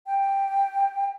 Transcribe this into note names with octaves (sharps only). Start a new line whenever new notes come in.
G5